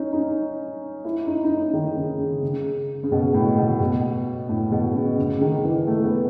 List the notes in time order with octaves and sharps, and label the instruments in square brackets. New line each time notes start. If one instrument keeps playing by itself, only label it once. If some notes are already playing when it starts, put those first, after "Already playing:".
Already playing: [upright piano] C#4 D#4
D#4
E4
D#4
D#4
C#4
D#3
C#3
C#3
C#3
C#3
B2
A2
B2
B2
A2
B2
C#3
C#3
D#3
E3
A3
B3